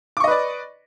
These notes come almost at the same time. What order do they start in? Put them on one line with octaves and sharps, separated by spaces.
D6 C#6 D#5 B4 D5